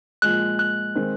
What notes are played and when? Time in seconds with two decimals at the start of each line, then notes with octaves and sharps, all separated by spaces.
0.22 A#2 F3 G#3 F#6
0.59 F#6
0.95 D#3 G#3 C4